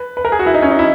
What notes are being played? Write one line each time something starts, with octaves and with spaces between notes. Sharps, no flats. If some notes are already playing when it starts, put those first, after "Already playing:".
Already playing: B4
B4
A#4
G#4
F#4
E4
D#4
C#4
D#4
E4